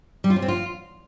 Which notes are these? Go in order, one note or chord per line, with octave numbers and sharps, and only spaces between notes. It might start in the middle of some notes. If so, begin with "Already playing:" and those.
G3
F4
C#4
C4
F4